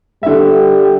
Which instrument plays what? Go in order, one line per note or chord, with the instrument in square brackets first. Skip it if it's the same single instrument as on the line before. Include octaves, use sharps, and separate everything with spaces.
[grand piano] D3 E5 [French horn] G3